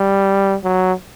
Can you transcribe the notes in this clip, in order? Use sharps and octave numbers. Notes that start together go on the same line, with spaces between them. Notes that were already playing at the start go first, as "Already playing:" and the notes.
Already playing: G3
F#3